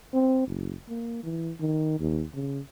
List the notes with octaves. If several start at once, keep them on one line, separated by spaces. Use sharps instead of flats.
C4
F#1
A#3
E3
D#3
D#2
C#3